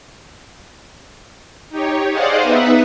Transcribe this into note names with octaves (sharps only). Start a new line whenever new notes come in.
D#4 G4 C#5
G#4 C5 D5 D#5 F5 F#5
B3 D#4 B4 E5 F#5